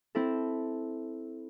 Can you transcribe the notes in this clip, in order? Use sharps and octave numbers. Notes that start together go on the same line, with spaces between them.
C4 E4 A4